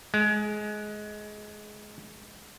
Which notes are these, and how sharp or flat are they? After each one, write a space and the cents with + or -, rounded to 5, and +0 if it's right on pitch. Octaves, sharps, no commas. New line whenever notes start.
G#3 +20